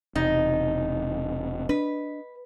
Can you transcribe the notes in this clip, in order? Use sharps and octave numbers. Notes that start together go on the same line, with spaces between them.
E1 C3 D#4 D#5
D4 B4